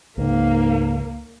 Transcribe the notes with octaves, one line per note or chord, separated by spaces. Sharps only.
C#2 G#2 A#3